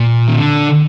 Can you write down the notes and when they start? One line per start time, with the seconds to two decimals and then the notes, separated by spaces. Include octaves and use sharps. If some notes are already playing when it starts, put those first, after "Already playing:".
Already playing: A#2
0.27 D#3
0.35 D3